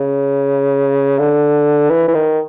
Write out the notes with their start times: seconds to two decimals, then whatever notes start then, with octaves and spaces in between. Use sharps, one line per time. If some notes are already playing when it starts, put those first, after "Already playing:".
Already playing: C#3
1.19 D3
1.90 E3
2.08 E3
2.14 D#3